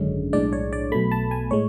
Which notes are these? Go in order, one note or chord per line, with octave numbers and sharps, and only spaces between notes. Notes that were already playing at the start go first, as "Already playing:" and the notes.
Already playing: G#1 F#2 D3 G#3 C#4
B1 A2 G#3 D4 D5
C#5
D5
B1 B2 A3 B5
A5
G#5
A2 G#3 C#5